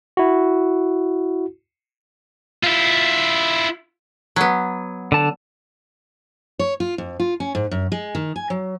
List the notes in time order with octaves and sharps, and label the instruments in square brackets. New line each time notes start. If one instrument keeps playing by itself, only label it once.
[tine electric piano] E4 F#4
[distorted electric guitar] E4 F4
[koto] F#3 B3
[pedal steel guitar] D3 A5
[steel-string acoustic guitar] C#5
F4
F2
F4
C#4
G#2
F#2
G#3
D#3
G#5
F#3